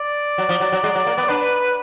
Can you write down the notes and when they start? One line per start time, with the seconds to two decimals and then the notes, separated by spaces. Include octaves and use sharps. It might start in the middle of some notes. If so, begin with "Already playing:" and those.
Already playing: D5
0.38 F#3
0.49 F3
0.60 F#3
0.72 F#3
0.84 G#3
0.95 F#3
1.07 A#3
1.18 B3
1.29 D4 B4